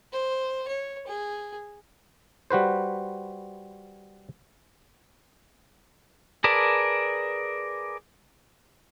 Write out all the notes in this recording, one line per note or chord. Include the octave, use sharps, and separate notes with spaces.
C5
C#5
G#4
G3 F#4 B4 C5
G#4 A#4 B4 D5 A5